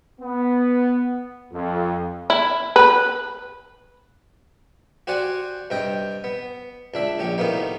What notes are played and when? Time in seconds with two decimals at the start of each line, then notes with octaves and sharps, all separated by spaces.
0.21 B3
1.52 F2
2.30 E4
2.76 B4
5.07 F#4 G4 C5 D5 F#5 G#5
5.70 G2 C3 D#5 G5
6.24 B3
6.94 C#2 D4 E5
7.19 A#1 C#4 G4
7.38 A2 C3 D#3 A#3 B3 D#4